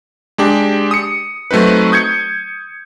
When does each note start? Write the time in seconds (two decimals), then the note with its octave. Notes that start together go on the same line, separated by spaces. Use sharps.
0.38 G#3 D4 G4
0.91 D#6 C#7
1.51 F#3 A3 C4 D#4 B4
1.92 D#6 G6 G#6 C#7